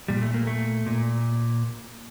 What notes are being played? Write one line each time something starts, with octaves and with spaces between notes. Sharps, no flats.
A#2 G3
A3
A#3
A3
A#2